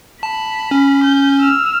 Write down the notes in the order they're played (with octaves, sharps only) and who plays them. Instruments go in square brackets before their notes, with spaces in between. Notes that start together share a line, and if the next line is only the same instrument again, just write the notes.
[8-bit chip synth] A5 [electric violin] B5
[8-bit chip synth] C#4
[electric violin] G6
E6 F6